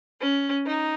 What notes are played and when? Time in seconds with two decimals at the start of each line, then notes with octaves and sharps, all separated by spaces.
0.20 C#4
0.65 D#4